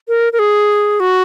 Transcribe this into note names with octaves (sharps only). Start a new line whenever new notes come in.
A#4
A#4
G#4
F#4